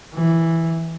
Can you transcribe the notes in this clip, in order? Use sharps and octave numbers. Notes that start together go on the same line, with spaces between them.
E3